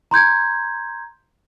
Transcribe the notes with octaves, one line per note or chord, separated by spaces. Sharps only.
A#5 C6 G6 G#6